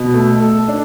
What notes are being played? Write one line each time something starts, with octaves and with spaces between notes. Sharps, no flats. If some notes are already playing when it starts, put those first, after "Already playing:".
Already playing: B2
A3
A4
D4